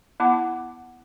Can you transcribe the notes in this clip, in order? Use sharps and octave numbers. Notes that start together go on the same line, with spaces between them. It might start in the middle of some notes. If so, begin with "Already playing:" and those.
B3 E4 F#5 A5 D6